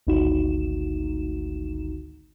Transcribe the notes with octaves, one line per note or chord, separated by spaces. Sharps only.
G#1 D2 D#4 F#4 E7